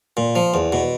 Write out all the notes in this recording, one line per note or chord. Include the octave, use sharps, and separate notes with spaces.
A#2
F3
E2
B2